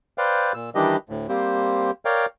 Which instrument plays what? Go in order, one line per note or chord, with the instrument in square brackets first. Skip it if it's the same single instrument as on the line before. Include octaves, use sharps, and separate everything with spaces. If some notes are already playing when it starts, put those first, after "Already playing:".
[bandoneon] B4 C5 D5 F5 G5
A#2 E6
D#3 E3 G3 D4 G4 D#5
D2 A2
G3 A#3 C4 G4 C5
A#4 C#5 D5 F5 G5